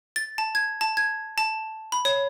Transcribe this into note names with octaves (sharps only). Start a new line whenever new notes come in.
A6
A5
G#6
A5
G#6
A5
B5
C#5